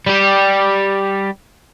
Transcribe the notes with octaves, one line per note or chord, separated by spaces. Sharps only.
G3 G4